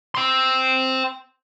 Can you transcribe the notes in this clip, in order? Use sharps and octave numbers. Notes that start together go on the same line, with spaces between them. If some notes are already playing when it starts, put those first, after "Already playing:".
G5 C6